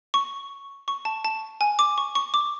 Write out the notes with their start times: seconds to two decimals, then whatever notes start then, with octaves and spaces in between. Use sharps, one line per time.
0.14 C#6
0.88 C#6
1.05 A5
1.25 A5
1.61 G#5
1.79 D6
1.98 C#6
2.15 C#6
2.34 D6